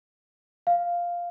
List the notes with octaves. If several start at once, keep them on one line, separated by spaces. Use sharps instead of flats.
F5